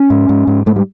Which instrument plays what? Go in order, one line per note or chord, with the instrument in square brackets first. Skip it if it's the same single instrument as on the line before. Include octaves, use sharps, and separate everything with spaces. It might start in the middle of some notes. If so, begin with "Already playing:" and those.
Already playing: [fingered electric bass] C#4
G#2
G#2
G#2
G#2 A3
G3